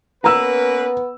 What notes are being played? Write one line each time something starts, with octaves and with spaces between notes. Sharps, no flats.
A#3 B3 C#4 B4 A#5 E6